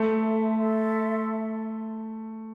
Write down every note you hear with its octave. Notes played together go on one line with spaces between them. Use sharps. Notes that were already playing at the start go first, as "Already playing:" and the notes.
Already playing: A3 A4 E5 A5 C6
A4 E5 A5 C6